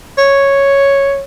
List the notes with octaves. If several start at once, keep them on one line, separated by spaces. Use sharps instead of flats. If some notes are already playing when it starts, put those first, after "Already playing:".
C#5